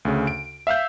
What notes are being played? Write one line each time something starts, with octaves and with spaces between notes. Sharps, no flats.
D2 C#3
D7
E5 F5 E6 G6